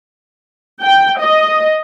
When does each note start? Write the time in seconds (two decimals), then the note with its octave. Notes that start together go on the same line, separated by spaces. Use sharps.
0.82 G5
1.20 D#5